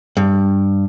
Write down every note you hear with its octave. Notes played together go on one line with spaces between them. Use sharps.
G2